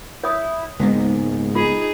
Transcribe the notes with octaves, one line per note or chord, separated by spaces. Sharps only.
E4 C#5 D#6
C#2 G#2 A#3 B3
D#4 F4 G#4